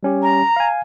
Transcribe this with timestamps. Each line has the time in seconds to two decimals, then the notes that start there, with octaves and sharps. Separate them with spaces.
0.03 G3 C#4 G4
0.22 A#5
0.56 F5 G#5